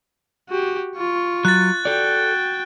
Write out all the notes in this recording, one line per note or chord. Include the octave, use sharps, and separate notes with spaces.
F#4 G4
F4 C#6
F#3 F#6 A6
F#4 A4 D5 G5